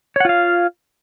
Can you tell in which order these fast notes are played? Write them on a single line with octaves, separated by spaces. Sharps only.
C#5 F#5 F4 F5